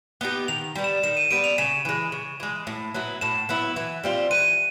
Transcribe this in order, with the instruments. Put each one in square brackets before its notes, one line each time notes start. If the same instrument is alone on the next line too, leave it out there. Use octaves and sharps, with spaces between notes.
[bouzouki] B3 D#4 G4
[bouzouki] D#3 [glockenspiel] F7
[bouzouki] G3 B3
[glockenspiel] E7
[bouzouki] D#3 [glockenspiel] E7
[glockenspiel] D#7
[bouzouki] G3 B3 [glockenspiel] D7
[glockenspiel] F7
[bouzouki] C#3 [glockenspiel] E7
[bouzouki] E3 G#3
C#3
E3 G#3
A2
F#3 B3 E4
[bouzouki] A2 [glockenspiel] E7
[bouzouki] F#3 B3 E4
E3
G3 C4 F4
[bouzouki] E3 [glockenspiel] D#7